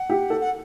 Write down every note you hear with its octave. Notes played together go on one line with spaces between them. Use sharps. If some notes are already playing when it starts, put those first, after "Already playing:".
Already playing: F#5
G4
A4
F#5